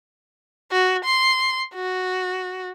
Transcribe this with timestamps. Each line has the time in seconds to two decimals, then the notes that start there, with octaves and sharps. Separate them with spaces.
0.71 F#4
1.05 C6
1.74 F#4